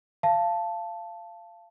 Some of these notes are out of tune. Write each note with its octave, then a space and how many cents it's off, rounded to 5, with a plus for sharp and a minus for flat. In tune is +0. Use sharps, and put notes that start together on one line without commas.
F5 -20 A5 +0